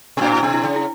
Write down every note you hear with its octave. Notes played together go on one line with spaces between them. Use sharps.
B2
A2 D4
E4
B2 D4
E4
C#3 D4
E4